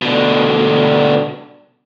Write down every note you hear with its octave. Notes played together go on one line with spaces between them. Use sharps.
B2 D3